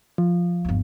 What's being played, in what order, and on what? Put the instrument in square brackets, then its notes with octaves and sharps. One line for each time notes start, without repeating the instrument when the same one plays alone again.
[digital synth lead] F3
[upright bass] G1 D#2